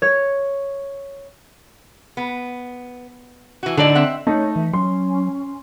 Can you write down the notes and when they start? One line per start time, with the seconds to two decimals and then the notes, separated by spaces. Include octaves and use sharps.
0.02 C#5
2.17 B3
3.63 E3 F#4
3.77 A2 D3 D#4 A4 D5
3.95 C4 E5 F#5
4.27 A3 D#4 C#5
4.56 E3 E5
4.73 F#3 C#4 C6